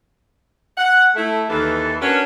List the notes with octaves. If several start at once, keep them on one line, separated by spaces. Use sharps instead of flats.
F#5
A3 E4
D#2 E3 A4
C#4 D4 F#4 A#4 B4 C#5